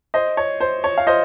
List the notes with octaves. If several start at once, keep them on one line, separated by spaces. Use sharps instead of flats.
C5 D#5
C#5
C5
C#5
F5
C5 D#5